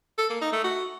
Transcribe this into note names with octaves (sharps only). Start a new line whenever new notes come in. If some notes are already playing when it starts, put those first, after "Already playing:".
A4
A#3
D#4
A3
F#4